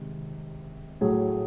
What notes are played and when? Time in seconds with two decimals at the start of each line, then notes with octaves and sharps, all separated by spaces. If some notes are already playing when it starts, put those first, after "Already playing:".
Already playing: C3 D#3 G#3
1.01 A2 F#3 A3 G#4